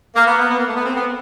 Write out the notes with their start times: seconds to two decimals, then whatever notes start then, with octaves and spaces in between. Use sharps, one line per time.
0.16 A#3
0.27 B3
0.39 B3
0.50 B3
0.58 A#3
0.67 A3
0.76 B3
0.85 C4
0.96 B3